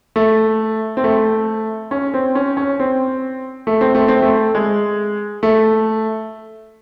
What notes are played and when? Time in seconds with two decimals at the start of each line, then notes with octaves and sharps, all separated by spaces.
0.16 A3
0.97 C4
1.04 A3
1.91 C#4
2.14 C4
2.35 C#4
2.57 C#4
2.79 C4
3.67 A3
3.81 C4
3.95 A3
4.08 C4
4.22 A3
4.55 G#3
5.43 A3